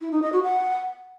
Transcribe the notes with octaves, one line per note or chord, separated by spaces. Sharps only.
E4
D#4
D#5
F#4
F#5